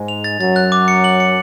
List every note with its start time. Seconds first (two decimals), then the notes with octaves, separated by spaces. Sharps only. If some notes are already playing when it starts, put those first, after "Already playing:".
Already playing: G#2 G#3
0.08 F7
0.24 A6
0.40 F#2 F#3 A6
0.56 F#6
0.72 D6
0.88 C#7
1.04 F#7
1.20 C#7